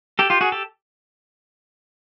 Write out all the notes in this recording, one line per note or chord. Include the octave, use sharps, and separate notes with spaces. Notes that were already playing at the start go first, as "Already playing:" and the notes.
G4 A4
F4 G4
F#4 G#4
G4 A4